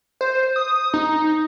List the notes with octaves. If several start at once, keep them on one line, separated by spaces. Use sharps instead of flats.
C5
D#6
D#4